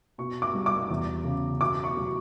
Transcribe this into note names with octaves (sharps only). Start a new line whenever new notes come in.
B2 C#6
D6
G3
D6
E2
C#3
B2 D6
C#6
F#3